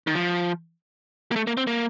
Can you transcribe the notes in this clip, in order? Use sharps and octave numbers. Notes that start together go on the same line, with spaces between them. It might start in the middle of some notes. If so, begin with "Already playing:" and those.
D#3
F3
A#3
A3
A#3
C4
A#3